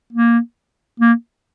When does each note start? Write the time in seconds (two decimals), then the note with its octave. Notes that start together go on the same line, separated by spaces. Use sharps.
0.13 A#3
1.00 A#3